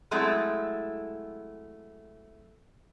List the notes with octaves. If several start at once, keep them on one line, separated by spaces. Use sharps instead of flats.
F#3 G#3 A3 C4 E4